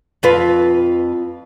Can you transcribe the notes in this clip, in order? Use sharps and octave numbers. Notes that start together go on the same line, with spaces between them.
F2 F4 B4